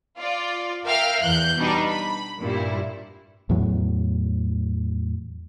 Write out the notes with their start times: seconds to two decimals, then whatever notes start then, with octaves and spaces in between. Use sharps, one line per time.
0.17 F4 D5
0.85 A#4 E5 F5 G5 F6
1.22 E2 F#6 G6
1.57 B2 G3 D4 D#4
1.87 B5
2.40 G2 A#2 G3 E4
3.49 E2 A2 F#3